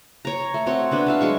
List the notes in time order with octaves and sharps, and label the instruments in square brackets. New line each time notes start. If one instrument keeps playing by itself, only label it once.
[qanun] C#5 A#5
A3
C4 F#4 C#5
B3 D4 B4
A4 E5 F5
F#3 G#3 C#6